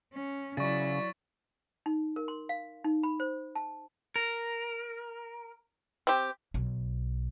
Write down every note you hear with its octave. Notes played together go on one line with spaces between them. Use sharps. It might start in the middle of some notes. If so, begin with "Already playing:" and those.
C#4
C#3 F#3 E4 D5 C#6 A6
D#4
A#4
C6
F5
D#4
B5
C5
A5
A#4
C4 G4
B1